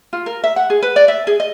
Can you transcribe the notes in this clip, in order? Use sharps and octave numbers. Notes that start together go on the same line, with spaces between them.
F4
A#4
E5
F#5
G#4
B4
D5
E5
G#4
D#5